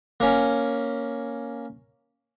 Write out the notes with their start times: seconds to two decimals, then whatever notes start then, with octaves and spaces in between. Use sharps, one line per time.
0.20 A#3 C#4